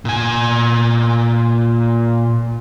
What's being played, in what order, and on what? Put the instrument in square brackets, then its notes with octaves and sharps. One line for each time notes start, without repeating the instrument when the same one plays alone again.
[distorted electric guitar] A#2 G#5